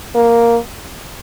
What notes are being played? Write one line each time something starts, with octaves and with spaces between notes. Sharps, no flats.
A#3